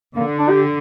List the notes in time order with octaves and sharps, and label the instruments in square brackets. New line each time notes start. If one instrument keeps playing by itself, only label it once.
[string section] D3 [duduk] A#3
[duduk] D4
G4